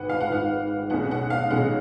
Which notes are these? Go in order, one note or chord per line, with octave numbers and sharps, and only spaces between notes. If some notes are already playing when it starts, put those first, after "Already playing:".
Already playing: G#1 G#2 D#3 B4 F#5
F5
F#5
G#1 G#2 D#3 F5
B1 B2 G#3 C#4 F#5
F#5
F5
B1 B2 G#3 C#4 F#5